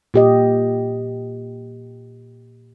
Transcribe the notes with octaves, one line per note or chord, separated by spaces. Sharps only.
A#2 G4 D#5